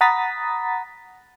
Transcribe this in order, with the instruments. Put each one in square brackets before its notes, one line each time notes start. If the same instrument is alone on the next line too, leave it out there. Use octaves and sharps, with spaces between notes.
[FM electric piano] F#5 A#5 B5 D#6 A6 B6